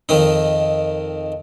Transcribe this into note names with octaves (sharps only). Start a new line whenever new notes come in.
F2 D#3 D#4